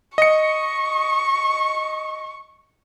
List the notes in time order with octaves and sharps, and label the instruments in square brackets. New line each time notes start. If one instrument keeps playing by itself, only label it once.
[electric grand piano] D#5 C#7 [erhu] C#6